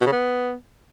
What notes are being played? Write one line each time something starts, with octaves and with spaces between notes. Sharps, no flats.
B2
C#3
B3